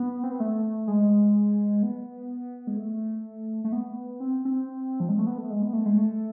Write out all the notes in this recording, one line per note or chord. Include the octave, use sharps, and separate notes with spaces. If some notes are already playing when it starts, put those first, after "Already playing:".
Already playing: B3
C4
B3
A3
G#3
B3
G#3
A3
A3
B3
C4
C4
F3
G#3
A3
B3
A3
G#3
B3
A3
G#3
A3